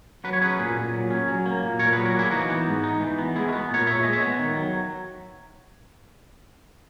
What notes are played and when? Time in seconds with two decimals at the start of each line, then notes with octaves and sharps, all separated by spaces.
0.24 F#3 B4
0.33 C#5
0.41 C#4 G#4 B4
0.59 A#2
0.76 A#2
0.94 F#3
1.10 C#4
1.28 F#3
1.46 A#3
1.62 A#2
1.79 A#2 A#4 C#5
1.93 F#3 G#4 B4
2.05 F#4 A#4
2.15 A#3 E4 G#4
2.26 G#4
2.31 E3 D#4 F#4
2.49 B3
2.66 G#2
2.84 D#4
3.00 E3
3.18 B3
3.35 G#3 E4 G#4
3.48 F#4 A#4
3.53 B3
3.70 A#2 A#4 C#5
3.87 A#2 C#5 E5
4.03 G#3 D#5
4.13 C#5 E5
4.21 B3
4.39 D#3
4.56 F#3